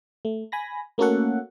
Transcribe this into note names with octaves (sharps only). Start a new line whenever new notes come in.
A3
G#5 B5 A#6
A3 A#3 C#4 F#4 A4 F#5